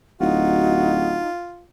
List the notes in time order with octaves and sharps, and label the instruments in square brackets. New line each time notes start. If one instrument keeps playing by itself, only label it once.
[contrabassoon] D1 [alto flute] D#4 [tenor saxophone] F4 [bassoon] F#4